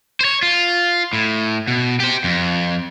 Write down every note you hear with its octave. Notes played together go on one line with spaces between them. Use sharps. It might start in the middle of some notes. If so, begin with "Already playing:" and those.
C5 C#5
F4
A2
B2
G4 C5
F2